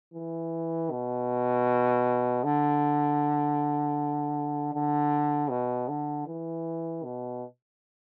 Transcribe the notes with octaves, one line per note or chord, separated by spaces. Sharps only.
E3
B2
D3
D3
B2
D3
E3
B2